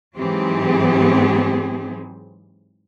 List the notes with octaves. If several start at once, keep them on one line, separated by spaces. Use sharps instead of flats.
G#2 E3 F#3 C4 G4 G#4